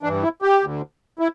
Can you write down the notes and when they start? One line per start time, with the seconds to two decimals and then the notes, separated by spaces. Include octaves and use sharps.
0.03 G2 E3 D4
0.23 E4
0.42 G4
0.61 D2 D3
1.19 E4